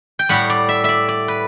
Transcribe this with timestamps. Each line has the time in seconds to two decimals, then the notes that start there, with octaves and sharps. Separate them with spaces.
0.19 G5
0.29 A2 G3 F#5
0.50 D5
0.69 E5
0.84 D5 E5
1.08 D5
1.28 B4